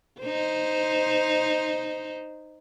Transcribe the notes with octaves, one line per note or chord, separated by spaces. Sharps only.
D#4 C5